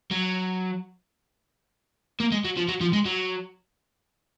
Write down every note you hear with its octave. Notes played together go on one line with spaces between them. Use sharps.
F#3
A#3
G#3
F#3
F3
F#3
F3
G#3
F#3